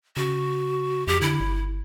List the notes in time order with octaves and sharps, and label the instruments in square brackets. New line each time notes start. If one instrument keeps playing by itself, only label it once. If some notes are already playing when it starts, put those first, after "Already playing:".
[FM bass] C#3 [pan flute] F#4
[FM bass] F2 [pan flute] G4
[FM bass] D3 [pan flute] E4
[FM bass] G1